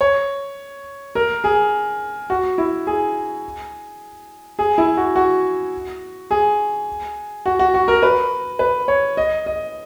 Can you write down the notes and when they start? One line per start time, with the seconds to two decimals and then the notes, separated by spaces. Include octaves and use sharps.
0.01 C#5
1.15 A#4
1.44 G#4
2.30 F#4
2.58 E4
2.87 G#4
4.59 G#4
4.78 E4
4.97 F#4
5.16 F#4
6.31 G#4
7.46 F#4
7.59 F#4
7.74 F#4
7.88 A#4
8.03 B4
8.59 B4
8.88 C#5
9.17 D#5
9.46 D#5